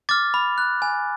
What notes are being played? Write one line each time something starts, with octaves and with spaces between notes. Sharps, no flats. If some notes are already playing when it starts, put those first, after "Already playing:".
D6 F6 A6
B5
F#6
G#5